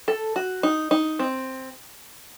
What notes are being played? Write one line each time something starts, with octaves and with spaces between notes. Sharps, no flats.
A4
F#4
D#4
D#4
C4